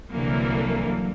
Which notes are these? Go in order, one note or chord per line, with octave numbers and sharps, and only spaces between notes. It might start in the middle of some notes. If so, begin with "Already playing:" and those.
C2 D3 E3 F#3 A#3